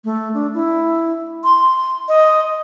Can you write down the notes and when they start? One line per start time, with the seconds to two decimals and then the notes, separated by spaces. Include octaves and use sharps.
0.05 A3
0.34 D4
0.54 E4
1.44 C6
2.08 D#5